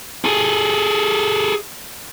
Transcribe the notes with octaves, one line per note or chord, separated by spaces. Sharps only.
G#4 A4